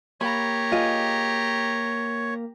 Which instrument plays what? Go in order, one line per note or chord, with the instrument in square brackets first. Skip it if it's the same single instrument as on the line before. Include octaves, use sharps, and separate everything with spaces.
[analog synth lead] A#3 [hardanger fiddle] G4 A#5 [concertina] C#5 [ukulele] B5
[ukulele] F4 G#4 D#5